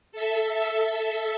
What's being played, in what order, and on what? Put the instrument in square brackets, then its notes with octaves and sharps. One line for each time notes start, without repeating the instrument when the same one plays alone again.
[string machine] A4 E5